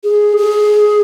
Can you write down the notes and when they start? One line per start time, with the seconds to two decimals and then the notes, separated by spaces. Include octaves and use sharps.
0.05 G#4
0.37 G#4